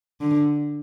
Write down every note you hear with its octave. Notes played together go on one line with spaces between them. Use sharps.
D3